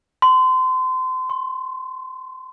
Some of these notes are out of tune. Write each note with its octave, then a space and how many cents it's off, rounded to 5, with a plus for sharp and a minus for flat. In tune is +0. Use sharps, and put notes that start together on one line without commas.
C6 -30
C6 +30